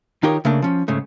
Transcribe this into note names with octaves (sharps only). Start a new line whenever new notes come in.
D#3 D#4 F4 G4 A#4 C#5
C#3 A3 A#3 D4
F3 C#4
G#2 C#3 A3